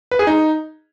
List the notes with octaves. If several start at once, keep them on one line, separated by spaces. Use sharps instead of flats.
B4
G#4
D#4